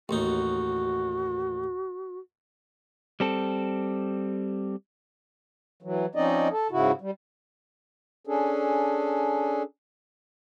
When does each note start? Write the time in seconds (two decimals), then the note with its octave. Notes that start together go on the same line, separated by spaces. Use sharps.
0.09 A1 D#2 D#4 F#4
3.20 G3 C4 A4
5.82 E3 F#3
6.15 F3 C4 C#4 D#4 D5 D#5
6.51 A4
6.71 G#2 C#3 E4 F#4
7.01 G3
8.27 C#4 D4 G#4 A4